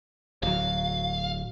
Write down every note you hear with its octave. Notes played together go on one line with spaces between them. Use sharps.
D1 F#3 F5